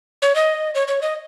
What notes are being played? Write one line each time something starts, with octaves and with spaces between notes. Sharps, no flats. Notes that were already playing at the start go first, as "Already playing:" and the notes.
C#5
D#5
C#5
C#5
D#5